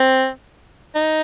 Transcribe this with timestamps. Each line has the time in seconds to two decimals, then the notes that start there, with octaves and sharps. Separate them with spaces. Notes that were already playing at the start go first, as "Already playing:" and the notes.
Already playing: C4
0.95 D#4